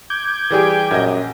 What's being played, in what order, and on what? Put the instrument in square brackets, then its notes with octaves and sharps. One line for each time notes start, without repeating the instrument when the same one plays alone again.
[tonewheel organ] D6 G6 G#6
[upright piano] E3 G3 G#4 [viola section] G4 G5 G#5
[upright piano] A#1 D#5 [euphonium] F#2